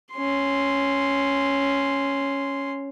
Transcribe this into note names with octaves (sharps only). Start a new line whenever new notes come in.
C#4 C6